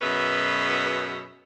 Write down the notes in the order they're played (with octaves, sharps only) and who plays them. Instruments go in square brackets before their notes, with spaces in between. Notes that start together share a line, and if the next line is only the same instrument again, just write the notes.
[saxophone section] F#2 B2 C#4 G#4 B4 E5